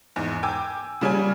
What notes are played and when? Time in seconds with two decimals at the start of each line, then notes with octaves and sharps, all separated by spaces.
0.16 E2 G#2
0.43 G5 G#5 D6 E6
1.01 C#3 G3 C#4 G#5